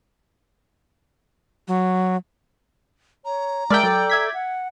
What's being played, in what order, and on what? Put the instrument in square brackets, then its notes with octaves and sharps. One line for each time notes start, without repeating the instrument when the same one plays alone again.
[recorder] F#3
[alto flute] C#5 [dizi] A#5
[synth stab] G#3 A#4 E5 [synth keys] D5 G5 [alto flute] A5
[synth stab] F#3 [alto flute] A4
[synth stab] E5 G#6 B6
[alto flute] F#5